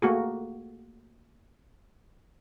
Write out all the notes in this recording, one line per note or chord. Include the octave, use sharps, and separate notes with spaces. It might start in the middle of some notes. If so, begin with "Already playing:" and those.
A3 A#3 F#4 G#4